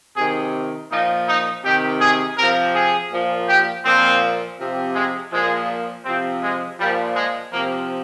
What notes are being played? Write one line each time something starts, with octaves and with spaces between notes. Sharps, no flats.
C3 D#3 G#4
A#2 F3 D#4
D#4
C3 D#3 G4
G#4
C3 F3 A#4
G#4
A#2 F3
G4
A#2 F3 C4
C3 F3
G#3
A#2 F3 G#3
C3 F3 C4
G#3
A#2 F3 G3
G#3
C3 F3 A#3